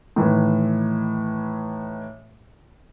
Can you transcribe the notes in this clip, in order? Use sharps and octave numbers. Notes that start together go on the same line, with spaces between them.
A2 D#3 E3